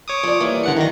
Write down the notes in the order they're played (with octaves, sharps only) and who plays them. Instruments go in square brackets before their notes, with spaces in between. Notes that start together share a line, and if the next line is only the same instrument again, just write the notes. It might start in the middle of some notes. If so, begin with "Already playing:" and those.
[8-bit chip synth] C#5 D6 D#6
[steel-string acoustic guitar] F3 D5
E3 G3 A#3
[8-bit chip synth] D3 F#5 C#7
[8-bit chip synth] D#3 A#6 [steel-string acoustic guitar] F#3 D4